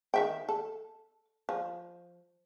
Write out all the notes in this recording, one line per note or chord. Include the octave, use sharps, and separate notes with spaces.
D#3 E5 G5
A4
F3